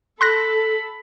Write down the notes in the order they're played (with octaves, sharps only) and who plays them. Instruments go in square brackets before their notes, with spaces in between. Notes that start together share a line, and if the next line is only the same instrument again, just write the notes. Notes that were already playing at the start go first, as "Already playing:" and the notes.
[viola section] A4 [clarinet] B5 [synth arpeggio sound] C6 F#6 A#6